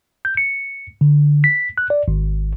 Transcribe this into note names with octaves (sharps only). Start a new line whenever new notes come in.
G6
C#7
D3
B6
F#6
D5
G#1